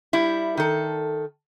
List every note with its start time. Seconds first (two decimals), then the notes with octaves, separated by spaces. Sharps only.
0.13 G3 E4
0.57 D#3 A4